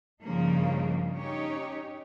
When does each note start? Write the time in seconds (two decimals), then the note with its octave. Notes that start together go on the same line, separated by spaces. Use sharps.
0.23 G2 C#3 F3 A#3 D#4
1.15 C#4 D#4 G4 C#5